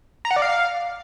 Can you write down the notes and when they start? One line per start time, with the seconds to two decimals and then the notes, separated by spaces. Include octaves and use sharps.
0.25 A#5
0.31 F#5
0.36 D5
0.42 F5